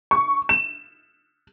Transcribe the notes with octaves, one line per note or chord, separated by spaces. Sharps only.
C#6
E7